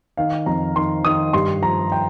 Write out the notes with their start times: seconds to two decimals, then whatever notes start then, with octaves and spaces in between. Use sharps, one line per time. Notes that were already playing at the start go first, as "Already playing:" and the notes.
0.17 D#3 F5
0.46 F2 A#5
0.76 D#3 C6
1.04 D#3 D#6
1.33 G2 C6
1.62 F3 A#5
1.92 G5